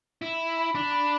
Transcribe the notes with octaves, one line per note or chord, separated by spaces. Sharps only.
E4 B6
B6
B5
D4 B6
B5